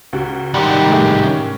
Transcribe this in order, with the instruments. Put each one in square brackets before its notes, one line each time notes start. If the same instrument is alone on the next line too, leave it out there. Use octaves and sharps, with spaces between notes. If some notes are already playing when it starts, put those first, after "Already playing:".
[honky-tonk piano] C#2 F#4
[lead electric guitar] C2 G#2 [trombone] D#3 [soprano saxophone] G4 [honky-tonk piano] D5 F#5 C6
[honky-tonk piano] G#3 A3 G#4
C#4